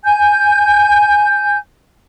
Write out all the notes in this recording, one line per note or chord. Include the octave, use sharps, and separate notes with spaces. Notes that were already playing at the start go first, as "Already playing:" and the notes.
G#5 G6